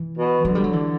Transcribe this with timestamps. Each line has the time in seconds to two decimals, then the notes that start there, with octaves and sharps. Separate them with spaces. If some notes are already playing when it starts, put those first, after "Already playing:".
Already playing: E3
0.17 B2
0.45 D3 F#3
0.55 G3
0.64 F#3
0.73 E3